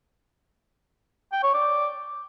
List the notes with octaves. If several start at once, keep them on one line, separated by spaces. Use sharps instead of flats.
G5
C#5
D5